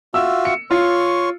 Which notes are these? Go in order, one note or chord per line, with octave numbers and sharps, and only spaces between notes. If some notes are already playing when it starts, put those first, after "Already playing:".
F4 F#4 E5 E6
C#7
F4 C#5 C6 C#6